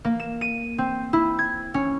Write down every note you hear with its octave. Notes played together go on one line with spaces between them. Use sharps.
A#3
E7
D#7
C4
E4
G#6
C#4